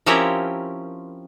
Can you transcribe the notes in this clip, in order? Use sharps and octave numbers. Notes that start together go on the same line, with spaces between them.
F3 C4 C#4 E4 G4 A#4